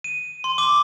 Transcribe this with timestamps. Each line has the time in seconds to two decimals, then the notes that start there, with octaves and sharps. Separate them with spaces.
0.04 D#7
0.44 C6
0.58 D6